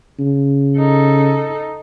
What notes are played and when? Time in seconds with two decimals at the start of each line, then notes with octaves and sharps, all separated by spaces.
0.19 C#3
0.78 D#4 A4